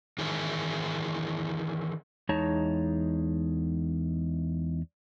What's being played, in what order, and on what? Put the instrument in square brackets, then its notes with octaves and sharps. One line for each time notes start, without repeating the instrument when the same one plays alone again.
[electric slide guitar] D#3 E3 E4 G#4 A#4
E2 G#3 D#4 C#5 A5 A#5